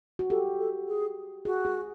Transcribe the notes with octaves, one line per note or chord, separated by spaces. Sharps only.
F#4
G4 A4
A4
G#4
F#4 G#4
G#4